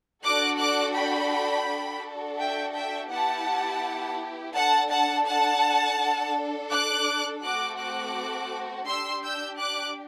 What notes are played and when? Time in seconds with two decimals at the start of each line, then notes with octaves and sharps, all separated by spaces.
0.23 D4 F#4 A4 D6 F#6
0.59 D6 F#6
0.94 G5 B5
1.67 D4 F#4 A4
2.39 E5 G5
2.75 E5 G5
3.11 B3 E4 G4 F#5 A5
4.54 D4 A4 F#5 A5
4.90 F#5 A5
5.27 F#5 A5
5.98 D4 A4
6.71 D6 F#6
7.42 A3 C4 F#4 A4 D6 F#6
7.79 D6 F#6
8.86 D4 G4 C6 E6
9.23 E6 G6
9.58 D6 F#6